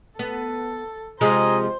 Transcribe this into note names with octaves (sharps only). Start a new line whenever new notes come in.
B3 A4
C3 F3 G#3 C5 D#5 G#5 A#5